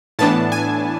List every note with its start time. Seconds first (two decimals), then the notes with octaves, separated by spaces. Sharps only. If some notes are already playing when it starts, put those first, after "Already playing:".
0.19 A2 E3 B3 D4 A5
0.52 G#5